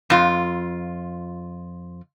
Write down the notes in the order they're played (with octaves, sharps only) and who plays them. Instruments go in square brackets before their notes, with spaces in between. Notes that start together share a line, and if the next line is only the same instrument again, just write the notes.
[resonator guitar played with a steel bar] F2 F4